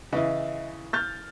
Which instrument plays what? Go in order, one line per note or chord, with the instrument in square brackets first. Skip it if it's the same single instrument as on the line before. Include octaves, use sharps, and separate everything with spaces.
[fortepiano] C#3 E3 [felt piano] D#5 E5
[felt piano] F6 G6 A6